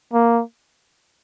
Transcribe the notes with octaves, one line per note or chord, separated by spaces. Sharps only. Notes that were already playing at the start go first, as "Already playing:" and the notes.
A#3